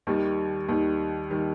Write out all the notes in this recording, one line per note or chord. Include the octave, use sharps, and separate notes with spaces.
D#2 D#3 G3
D#2 D#3 G3
D#3 G3